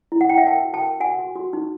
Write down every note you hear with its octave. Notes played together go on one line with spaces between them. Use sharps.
E4
F#5
E4 G5
E5 F#5
A#4 G5 A5
F#4
G5 A5
A#4
F#4 F#5 G#5
F#4
F#4
D#4